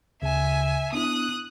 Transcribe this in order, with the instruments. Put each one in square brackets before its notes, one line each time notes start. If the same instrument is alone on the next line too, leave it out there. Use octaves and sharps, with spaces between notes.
[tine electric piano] D2 C#3 [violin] E5 G#5
[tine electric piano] B3 D4 E4 [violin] D#6 F#6